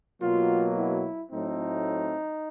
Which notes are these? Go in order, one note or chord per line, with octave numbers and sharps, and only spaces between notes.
B2 F#3 A#3 F4
E4
A2 F#3 A3 C4 D#4